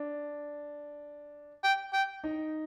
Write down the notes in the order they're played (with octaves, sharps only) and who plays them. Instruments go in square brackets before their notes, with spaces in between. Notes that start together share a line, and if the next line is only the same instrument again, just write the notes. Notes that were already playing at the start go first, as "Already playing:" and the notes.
Already playing: [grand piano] D4
[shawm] G5
G5
[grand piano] D#4